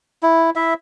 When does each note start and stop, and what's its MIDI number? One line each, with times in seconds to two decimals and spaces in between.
0.23 0.50 64
0.56 0.74 64
0.56 0.74 76